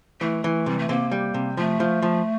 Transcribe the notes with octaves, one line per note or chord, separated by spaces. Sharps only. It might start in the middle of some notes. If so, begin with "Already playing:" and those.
E3 A3
E3
C3 G3
A3
C3 A#3
G3
C3
F3 A3
F3
F3